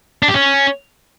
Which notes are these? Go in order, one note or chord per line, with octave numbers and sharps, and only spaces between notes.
D4
G4
C#4